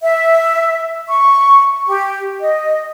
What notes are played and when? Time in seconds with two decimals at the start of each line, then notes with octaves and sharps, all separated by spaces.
0.02 E5
1.08 C#6
1.87 G4
2.41 D#5